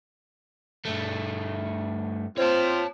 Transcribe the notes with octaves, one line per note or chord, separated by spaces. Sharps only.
G2 A3
C4 F4 C5 C#5 A5